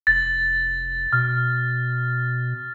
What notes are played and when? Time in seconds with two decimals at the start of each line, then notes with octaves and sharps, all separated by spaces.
0.07 F1 A6
1.13 B2 F6